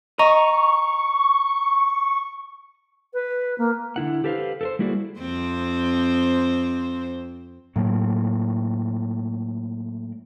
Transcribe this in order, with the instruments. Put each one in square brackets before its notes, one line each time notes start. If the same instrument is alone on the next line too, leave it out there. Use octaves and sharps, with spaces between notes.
[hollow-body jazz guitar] D#5 [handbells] A#5 [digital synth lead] C#6
[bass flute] B4
A#3
[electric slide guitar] D3 E4 F#5
G4 A4 B4 C5 F5
A4 A#4 C5
G3 A#3 E4 F#4 G#4 D5
[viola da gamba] F2 C4 C5
[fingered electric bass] A2 F#3 A#3